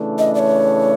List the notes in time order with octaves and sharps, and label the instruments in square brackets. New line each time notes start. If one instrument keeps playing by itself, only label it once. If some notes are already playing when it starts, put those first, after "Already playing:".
Already playing: [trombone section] C#3 E3 A3 D4
[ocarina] D#5
D5
C#5